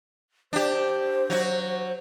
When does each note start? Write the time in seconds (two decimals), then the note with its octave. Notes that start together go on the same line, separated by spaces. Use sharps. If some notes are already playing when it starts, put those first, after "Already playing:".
0.53 D4 G4 C5
1.30 F#3 F#4